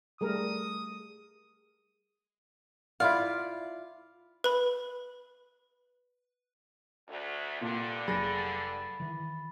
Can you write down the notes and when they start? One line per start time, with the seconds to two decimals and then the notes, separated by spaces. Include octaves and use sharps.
0.21 G3 A3 G#4 A#4 D#6
3.00 E4 F4 D5 F5
4.44 B4 B5
7.09 D2
7.61 G2 A#2 D3
8.08 F1 F#3 G#4 B5 A6 A#6
9.00 D#3 E3